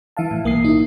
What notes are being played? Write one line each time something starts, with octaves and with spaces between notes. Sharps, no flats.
E3 E5 F5 A5
A2
B1 A#3 D#6 C7
D#4 E4